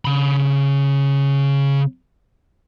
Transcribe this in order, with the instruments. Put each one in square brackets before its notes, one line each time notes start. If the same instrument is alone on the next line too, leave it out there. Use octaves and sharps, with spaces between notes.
[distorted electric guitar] C#3 B5